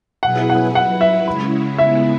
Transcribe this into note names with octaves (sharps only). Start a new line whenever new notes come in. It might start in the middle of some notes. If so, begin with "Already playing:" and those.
B2 F#3 E4 G#4 B4 F#5
F#5
F#3 E4 B4 F#5
E5
C#3 G#3 C#4 E4 B5
C#3 G#3 B3 E4 E5